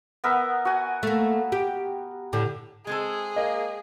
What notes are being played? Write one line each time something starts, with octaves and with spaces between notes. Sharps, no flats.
B3 A#4 E5
F#4 G#5
A3 A#3
G4
A2 D3 G4
G#3 C4 G#4 A4
A#3 D#5